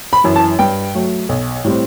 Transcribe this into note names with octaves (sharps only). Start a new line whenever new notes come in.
B5
F#2 E3
A5
G2 G5
F#3 A3
B1
A2 G3 C4